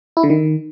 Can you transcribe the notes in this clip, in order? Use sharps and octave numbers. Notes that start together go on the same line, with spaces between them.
E4
D3
D#3